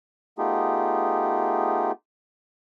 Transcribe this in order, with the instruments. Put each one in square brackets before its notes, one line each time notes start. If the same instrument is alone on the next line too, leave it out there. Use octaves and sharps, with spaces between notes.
[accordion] A3 B3 D#4 F4 G4 G#4